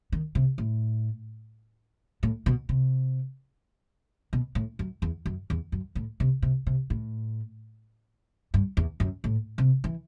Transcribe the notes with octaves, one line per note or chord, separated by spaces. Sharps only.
D#3
C3
A2
A2
B2
C3
B2
A2
F#2
E2
F#2
E2
F#2
A2
C3
C3
C3
A2
G2
E2
F#2
A2
C3
E3